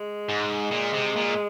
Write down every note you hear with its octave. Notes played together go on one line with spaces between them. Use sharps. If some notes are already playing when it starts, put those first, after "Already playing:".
Already playing: G#3
G#2
A#2
C3
A#2